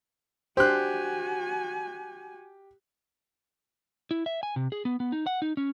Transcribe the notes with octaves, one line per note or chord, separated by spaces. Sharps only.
D4 F#4 G4 C5 G#5 F#6
E4
E5
G#5
C3
G#4
B3
B3
D#4
F#5
D#4
C#4